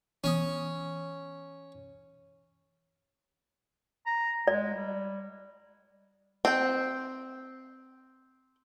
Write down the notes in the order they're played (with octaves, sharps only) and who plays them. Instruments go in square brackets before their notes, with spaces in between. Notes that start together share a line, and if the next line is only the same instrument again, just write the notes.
[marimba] E3 B3 D#6 [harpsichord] C#4
[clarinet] A#5
[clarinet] G#3 [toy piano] D5
[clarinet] G3
[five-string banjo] C4 G5